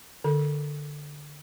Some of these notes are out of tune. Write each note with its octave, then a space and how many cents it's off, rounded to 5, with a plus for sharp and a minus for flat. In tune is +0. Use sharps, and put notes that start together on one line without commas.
D3 +0 A4 +0